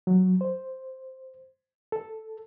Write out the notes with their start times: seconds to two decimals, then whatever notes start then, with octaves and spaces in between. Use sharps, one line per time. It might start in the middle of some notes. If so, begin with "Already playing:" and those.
0.07 F#3
0.41 C5
1.92 A4